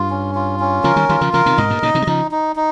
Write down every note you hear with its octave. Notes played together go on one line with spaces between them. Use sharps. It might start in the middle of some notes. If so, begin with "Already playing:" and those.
Already playing: G2 F4
C#4
F4
C#4
C#3 F3 A#4
D#3 G3
D#3 G3 F4
C#3 F3
C#3 F3 A#4
C3 D#3
G#2 C3 D#5
G2 A#2
A#2 C#3 D#4
C3 D#3
G3
C#3 F3 D#4
D#4
D#4